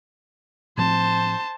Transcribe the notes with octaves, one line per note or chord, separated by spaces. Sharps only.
A2 F3 C4 C5 A5